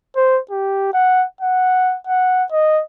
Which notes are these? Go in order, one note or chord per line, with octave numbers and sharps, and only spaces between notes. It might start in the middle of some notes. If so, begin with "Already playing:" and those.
C5
G4
F#5
F#5
F#5
D#5